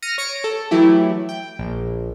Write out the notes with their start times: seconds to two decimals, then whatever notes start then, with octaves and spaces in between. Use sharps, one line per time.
0.02 F6 A#6 C#7 D#7
0.18 C#5 A#6 C#7 D7
0.44 A4
0.71 E3 F#3 A3 E4 G4
1.29 G5
1.59 A#1